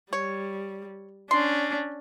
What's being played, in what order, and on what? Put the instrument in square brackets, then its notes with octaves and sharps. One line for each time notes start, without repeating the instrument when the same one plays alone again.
[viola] G3 [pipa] C#5
[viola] C#4 D4 [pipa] C6